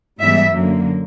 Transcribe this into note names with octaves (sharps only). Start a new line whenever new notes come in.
G#2 E3 G3 B3 E5
F#2 D3 F#3 A#3